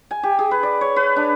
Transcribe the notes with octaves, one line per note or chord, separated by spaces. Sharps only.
G#5
G4
G#4
B4
D5
C#5
B4
D4